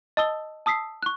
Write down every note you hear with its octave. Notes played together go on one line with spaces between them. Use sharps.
D#5 A5 D#6 E6 G7
A5 D#6 E6 B6 C7
C#6 F#6